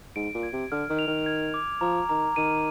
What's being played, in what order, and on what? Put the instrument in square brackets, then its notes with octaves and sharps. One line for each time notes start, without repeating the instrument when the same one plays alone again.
[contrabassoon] G#2 [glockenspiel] D7
[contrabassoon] A#2
[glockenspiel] G#6
[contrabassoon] C3
[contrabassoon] D3 [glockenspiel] F6
[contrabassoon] D#3
[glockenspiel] F7
[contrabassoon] D#3
[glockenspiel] G#6
D6
[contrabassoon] F3 [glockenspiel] A#5
[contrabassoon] D#3 [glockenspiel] A#5
[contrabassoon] D#3 [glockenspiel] D#7